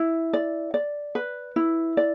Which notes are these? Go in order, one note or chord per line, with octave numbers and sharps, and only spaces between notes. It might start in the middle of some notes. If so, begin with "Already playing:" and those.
Already playing: E4
D5
D5
B4
E4
D5